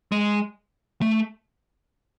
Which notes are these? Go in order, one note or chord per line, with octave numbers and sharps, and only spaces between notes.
G#3
A3